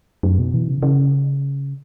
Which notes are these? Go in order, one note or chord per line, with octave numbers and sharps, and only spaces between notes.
F#2
B2
E3
C#3
C#3